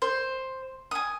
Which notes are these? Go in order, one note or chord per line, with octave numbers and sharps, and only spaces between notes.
C5
G#5 D#6